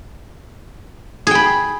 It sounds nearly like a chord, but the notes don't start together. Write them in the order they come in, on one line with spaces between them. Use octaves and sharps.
G#4 G5 B5